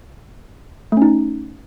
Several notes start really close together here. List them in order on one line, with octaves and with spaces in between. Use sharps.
A3 C#4 D#4